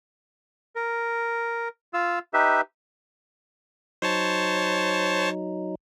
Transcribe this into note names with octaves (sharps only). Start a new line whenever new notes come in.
A#4
F4 E6
D#4 G4 B4 E5
F#3 D#4 C5 C#5 A5